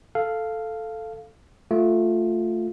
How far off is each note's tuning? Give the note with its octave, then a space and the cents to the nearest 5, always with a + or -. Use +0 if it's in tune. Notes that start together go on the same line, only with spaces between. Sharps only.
A4 +0 F5 -5
A3 +5 F4 +10